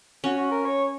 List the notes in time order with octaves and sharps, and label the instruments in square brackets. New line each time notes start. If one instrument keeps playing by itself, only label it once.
[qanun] C#4 [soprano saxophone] F#4
[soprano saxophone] F#4
A#4
C#5